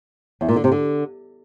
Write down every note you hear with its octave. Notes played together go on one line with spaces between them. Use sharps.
E2
A#2
D3
C3
D3